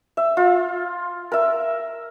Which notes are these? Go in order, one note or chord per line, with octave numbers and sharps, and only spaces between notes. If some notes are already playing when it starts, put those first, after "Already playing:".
E5
F4
A#4 E5